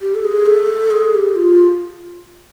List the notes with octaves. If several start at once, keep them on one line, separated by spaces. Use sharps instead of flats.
G4
A4
G#4
A4
G#4
G4
F4